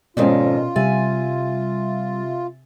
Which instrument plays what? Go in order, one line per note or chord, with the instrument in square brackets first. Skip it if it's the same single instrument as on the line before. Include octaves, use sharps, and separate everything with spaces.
[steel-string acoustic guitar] F2 G#2 D#3 [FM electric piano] B2 [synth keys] C#4 C#5 D5 [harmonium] F4
[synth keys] C3 E5 A6 [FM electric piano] G3 [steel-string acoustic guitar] G#5